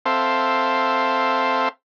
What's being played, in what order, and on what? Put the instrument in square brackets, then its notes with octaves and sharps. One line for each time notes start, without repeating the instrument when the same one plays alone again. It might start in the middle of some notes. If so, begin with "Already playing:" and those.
[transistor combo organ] C4 A4 C5 E5 F5